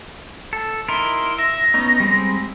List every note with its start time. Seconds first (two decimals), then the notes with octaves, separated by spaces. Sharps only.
0.53 A4
0.88 D#4 E4 A#4 C6
1.38 E5 A#6
1.74 B3 C#4 D#4
2.00 G3 G#3 C4